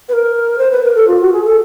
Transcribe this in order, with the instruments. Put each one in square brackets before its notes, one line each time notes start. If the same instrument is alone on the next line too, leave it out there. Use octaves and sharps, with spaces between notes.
[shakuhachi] B4
A#4
C5
B4
A#4
A4
F4
F#4
G#4
A4